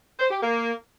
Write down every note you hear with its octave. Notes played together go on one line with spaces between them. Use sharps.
C5
G4
A#3